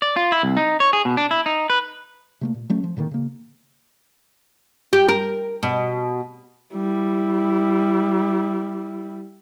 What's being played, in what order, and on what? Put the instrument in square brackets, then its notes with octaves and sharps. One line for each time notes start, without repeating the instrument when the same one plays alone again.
[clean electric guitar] D5
F4
E4
C2
D#4
C#5
G#4
B2
D4
E4
D#4
B4
[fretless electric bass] C3 A3 A#3
A#2
F#3 A3 C#4
F3
A2 D3 D#3 A#3
C#3 A#3
[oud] G4
A#4
B2
[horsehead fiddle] G3 E4